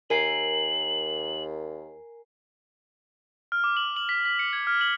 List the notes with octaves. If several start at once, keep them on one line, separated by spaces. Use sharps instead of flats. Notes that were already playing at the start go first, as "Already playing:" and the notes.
D#2 A#4 G#5 C7 F#7
F6
D6
F#7
F#7
B6
B6
C#7
G#6
F6
F#7